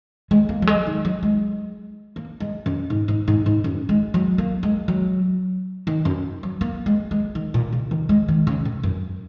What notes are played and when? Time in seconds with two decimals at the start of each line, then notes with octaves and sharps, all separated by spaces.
0.31 G#3
0.49 A#3
0.62 F#3
0.67 G#3
0.87 D#3
1.05 F#3
1.23 G#3
2.16 A#3
2.40 G#3
2.66 F#2
2.90 G#2
3.08 G#2
3.28 G#2
3.46 G#2
3.64 F#2
3.89 G#3
4.14 F#3
4.38 A#3
4.63 G#3
4.88 F#3
5.87 D#3
6.05 F#2
6.43 F#3
6.61 A#3
6.86 G#3
7.11 G#3
7.35 D#3
7.54 A#2
7.72 C#3
7.91 D#3
8.09 G#3
8.28 D#3
8.47 C#3
8.65 A#2
8.83 F#2